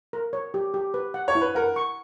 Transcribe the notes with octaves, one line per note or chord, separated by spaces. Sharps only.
A#4
C#5
G4
G4
B4
F#5
C#5
E4
B4
A#4 F#5
C#6